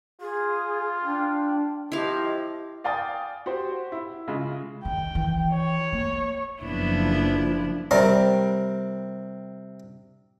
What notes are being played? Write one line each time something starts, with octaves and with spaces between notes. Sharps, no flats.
F4 G#4
D4 G5
F3 E4 G4 D#5 F5
D5 F5 G5 G#5 D#6 A6
F#4 G4 C5
E4
C#3 G#3 F4
D#3 G5
E3
C#5
A#3
F#1 F3 B3 D4 E4
C3 G3 A#4